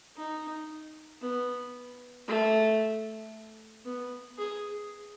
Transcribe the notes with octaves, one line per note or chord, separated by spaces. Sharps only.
D#4
B3
A3
B3
G#4